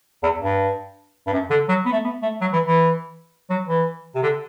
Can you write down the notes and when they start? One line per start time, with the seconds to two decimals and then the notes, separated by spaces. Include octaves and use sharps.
0.23 E2
0.41 G2
1.26 G2
1.32 F#2
1.50 D3
1.69 F#3
1.85 B3
1.92 A3
2.04 B3
2.22 A3
2.41 F#3
2.53 E3
2.65 E3
3.50 F#3
3.68 E3
4.15 C3
4.22 D3